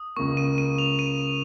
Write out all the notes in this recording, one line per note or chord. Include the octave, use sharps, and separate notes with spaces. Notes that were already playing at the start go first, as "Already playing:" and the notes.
Already playing: D#6
C#2 C#3 A#3 C#6
D#7
D#7
F7
D#7